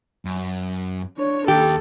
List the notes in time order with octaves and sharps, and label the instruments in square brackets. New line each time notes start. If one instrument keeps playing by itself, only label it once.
[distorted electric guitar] F#2
[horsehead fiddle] D4 C#5
[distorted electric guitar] D#2 [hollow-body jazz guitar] G4 [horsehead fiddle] A4